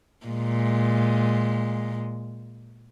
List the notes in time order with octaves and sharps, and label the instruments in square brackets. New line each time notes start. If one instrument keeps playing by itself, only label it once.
[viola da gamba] A#2 G#3